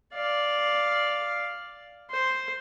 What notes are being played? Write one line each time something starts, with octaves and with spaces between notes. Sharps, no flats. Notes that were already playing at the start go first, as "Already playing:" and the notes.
D5 F5
C5